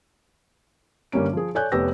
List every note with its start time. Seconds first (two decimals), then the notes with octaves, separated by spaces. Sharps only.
1.12 G1 G3 A#3 C#4 D7
1.33 F3 G#4
1.55 A4 C#5 D5 G#5 F#6 G6
1.72 F1 B3 G4 C#5 E6 A#6